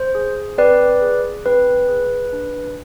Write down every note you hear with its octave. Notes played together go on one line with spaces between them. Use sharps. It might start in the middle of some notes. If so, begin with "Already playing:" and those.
Already playing: C5
G#4
C4 B4 D5
G#4
C4 B4
G#4
D4